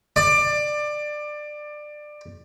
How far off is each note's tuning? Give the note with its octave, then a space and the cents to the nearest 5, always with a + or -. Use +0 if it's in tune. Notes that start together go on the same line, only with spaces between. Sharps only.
D5 +20